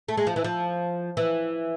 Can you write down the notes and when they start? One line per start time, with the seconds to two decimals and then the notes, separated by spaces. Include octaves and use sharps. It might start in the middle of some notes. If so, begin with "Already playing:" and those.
0.08 A3
0.17 G#3
0.27 F3
0.36 E3
0.44 F3
1.17 E3